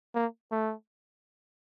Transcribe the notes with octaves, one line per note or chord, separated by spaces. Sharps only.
A#3
A3